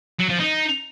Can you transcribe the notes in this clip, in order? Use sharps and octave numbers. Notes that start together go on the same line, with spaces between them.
F#3
F3
D#4